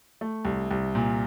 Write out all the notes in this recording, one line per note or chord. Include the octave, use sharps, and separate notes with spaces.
A3
C2
C2
A#2